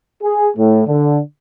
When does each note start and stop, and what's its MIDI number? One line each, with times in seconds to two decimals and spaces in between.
0.22 0.48 68
0.56 0.81 45
0.87 1.18 50